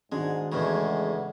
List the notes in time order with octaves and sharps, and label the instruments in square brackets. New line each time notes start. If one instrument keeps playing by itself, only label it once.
[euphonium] G#2 [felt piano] D#3 D4 F#4 [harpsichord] G#3
[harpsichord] E2 A2 C#3 [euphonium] G#3